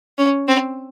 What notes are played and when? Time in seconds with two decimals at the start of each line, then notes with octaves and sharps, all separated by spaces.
0.18 C#4
0.48 C4